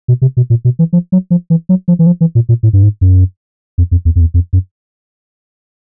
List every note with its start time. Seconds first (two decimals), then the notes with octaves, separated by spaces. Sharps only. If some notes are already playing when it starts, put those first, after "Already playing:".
0.08 B2
0.22 C3
0.37 B2
0.50 A#2
0.65 B2
0.79 E3
0.93 F3
1.12 F#3
1.31 F3
1.50 E3
1.69 F#3
1.88 F3
1.99 E3
2.06 F3
2.21 E3
2.35 A#2
2.49 A#2
2.63 A2
2.73 G2
2.83 G#2
3.01 F#2
3.78 F2
3.91 F2
4.05 E2
4.16 F2
4.21 E2
4.34 F2
4.53 F#2